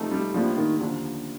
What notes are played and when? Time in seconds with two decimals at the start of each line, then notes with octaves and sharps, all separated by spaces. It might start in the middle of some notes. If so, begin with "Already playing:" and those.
Already playing: C3 F3 A3 D#4
0.11 G3
0.34 A2 F3 G3 A#3 D4 F4
0.57 D#3
0.80 D#2 D3 F3